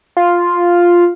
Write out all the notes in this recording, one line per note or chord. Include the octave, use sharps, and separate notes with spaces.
F4